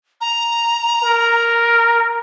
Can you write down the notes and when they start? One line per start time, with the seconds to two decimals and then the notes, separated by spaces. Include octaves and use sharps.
0.21 A#5
1.03 A#4